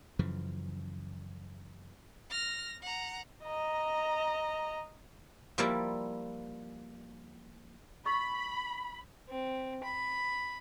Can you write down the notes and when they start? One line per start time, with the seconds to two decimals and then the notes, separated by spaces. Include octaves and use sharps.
0.19 F#2 C#3 E3 F3
2.31 F6 A#6
2.82 F#5 A#5
3.44 D#5 A#5
5.58 F3 G3 A#3 E4 D5
8.06 D#5 B5 C#6 E6
9.30 C4
9.84 B5